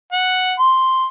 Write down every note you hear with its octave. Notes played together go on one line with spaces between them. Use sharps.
F#5
C6